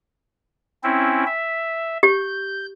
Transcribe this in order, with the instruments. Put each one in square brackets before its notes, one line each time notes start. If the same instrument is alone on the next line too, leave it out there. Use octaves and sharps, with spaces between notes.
[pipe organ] C4 C#4 E4
E5
[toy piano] G4 [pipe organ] G6